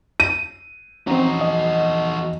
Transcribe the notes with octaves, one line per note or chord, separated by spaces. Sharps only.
D#7
E2 F3 C4 C#4 D#4 F#4 A#5
D#5